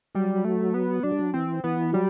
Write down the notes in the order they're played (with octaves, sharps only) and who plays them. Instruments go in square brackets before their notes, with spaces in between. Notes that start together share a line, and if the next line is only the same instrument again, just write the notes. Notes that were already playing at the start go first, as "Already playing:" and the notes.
[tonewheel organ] F#3 [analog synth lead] G3
[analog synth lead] A3
B3
[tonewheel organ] F#3 [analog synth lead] D4
[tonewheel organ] G3
F#3
[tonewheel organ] E3 [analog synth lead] C4
[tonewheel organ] E3 [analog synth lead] B3
[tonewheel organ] F#3 [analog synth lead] G3